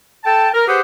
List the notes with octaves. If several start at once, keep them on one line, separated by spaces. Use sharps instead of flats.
A4 G5 A5
A#4
G4 G#4 B4 C5 F#5